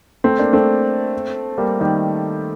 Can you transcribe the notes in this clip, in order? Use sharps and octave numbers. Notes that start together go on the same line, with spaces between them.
A3 C4
A#3 D4
A3 C4
G3 A#3
D#3 G3